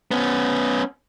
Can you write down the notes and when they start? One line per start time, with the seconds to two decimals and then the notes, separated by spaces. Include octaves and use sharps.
0.11 B3 C#4